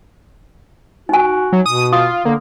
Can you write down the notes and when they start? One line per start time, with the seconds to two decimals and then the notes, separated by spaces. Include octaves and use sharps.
1.09 D#4 F#4 G#5
1.53 F#3
1.66 B2 D#6
1.93 F4 D#6
2.25 D3 A#3